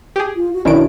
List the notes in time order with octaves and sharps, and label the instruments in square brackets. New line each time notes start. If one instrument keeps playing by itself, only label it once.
[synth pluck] G4 G#4
[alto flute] F4
F#4
[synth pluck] B1 D#3 D7 [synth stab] C#4 D4 E4 [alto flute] F#4